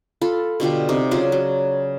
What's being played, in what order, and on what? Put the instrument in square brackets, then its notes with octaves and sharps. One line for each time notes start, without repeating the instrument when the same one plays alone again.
[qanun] F4 A4 B5
B2 D3 F4 G4
C3 D#4
C#3 F#3 F4 D5
F#3